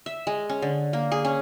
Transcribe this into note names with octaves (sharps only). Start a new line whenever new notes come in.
E5
G#3
C#4
D3
A#3
G#4
C#4